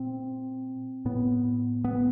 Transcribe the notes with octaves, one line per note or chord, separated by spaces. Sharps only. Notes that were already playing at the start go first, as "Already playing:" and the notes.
Already playing: A#2 C4
A2 B3
B3